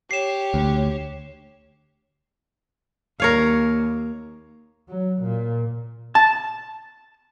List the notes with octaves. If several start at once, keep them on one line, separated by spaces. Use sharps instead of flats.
G4 C#5 C7 E7
D2
D#2 A#4 C#5 F5
F#3
A#2
A5